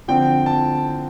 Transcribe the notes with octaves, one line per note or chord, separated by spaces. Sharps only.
D3 F3 C4 G5
A5